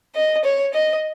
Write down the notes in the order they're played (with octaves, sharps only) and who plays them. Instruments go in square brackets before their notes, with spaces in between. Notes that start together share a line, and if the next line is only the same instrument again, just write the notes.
[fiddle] D#5
C#5
D#5